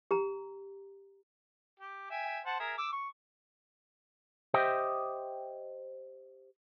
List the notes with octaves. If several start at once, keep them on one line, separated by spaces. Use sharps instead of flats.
G4 A#5
G4
E5 G5 G#5
C5 F#5 A5
G#4 A#4 E5
D6 E6
C#6
G4 C5 D#5 E5 G5